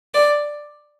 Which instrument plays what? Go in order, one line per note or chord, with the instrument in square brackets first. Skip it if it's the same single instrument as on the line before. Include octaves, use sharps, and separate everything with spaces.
[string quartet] D5